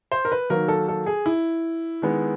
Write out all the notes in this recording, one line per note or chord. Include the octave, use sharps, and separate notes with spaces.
C5
A#4
B4
D#3 F#3 A#3 A#4
A4
A4
G#4
E4
D#3 G#3 B3